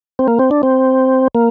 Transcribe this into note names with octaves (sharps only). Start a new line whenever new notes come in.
C4
A#3
C4
D4
C4
A#3